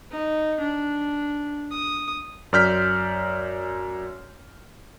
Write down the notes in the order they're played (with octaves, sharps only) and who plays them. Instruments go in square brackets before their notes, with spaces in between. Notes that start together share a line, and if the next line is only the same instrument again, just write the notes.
[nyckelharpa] D#4
D4
D#6
[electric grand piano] F#2 D5 F6 G6 B6